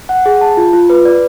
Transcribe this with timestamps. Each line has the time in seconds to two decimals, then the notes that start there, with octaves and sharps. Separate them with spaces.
0.09 F#5
0.26 G#4
0.41 A5
0.57 F4
0.73 F4
0.90 B4
1.05 D5